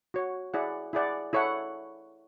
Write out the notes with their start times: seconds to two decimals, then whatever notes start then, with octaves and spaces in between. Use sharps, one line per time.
0.14 F#4 C#5 F#5
0.54 E4 G#4 D5 F#5
0.93 E4 G#4 D5 F#5
1.33 E4 A4 C#5 F#5